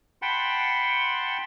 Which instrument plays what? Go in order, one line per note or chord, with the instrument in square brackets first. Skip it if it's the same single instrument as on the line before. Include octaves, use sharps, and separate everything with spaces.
[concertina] F#5 G5 A5 B5 C6